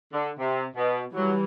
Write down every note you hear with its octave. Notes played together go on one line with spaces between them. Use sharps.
D3
C3
B2
E3 F#3 G3